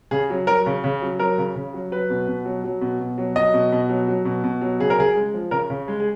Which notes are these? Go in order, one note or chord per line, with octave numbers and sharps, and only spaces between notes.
C#3 G#4
F#3
F#3 A#4
C#3
C#3
F#3
F#3 A#4
C#3
C#3
F#3
F#3 B4
B2
B2
F#3
F#3
B2
B2
F#3
F#3 D#5
B2
B2
F#3
F#3
B2
B2
F#3
C#3 G#4
A#4
C#3 G#4
G#3
F3
C#3 A#4
C#3
G#3
G#4